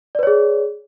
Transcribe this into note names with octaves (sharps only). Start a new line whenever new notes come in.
G#4 B4 C#5 D5